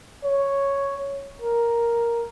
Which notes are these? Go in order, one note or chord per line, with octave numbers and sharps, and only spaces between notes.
C#5
A#4